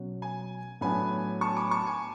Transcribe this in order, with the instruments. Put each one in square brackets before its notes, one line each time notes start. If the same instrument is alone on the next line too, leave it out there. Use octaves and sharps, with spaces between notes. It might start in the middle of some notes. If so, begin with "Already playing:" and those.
Already playing: [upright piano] B2 F#3 C#4 F#4
[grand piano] G#5
[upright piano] A2 F#3 B3 D4 [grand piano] G#5 B5
[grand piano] A5 C#6
B5 D6
A5 C#6
G#5